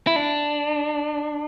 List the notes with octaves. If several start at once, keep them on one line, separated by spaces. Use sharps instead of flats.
E4
D4